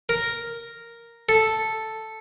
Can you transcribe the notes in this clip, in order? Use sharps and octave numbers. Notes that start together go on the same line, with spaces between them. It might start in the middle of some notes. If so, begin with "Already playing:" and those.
A#4
A4